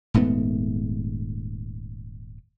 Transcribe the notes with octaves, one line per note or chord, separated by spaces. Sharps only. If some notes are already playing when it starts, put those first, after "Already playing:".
D#1 G#2 A3 B3